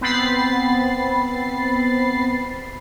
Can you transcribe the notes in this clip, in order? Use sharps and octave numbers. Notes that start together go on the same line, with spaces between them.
B3 C4 B5 A6 C7